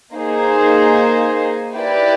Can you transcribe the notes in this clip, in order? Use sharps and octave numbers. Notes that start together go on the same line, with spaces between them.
A#3 D#4 G#4 C5
E4 G4 B4 D5